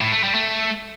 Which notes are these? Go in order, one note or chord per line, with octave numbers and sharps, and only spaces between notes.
A2
A3
G3
A3